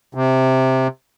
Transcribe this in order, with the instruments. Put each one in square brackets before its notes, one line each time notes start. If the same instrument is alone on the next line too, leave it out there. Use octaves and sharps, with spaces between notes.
[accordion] C3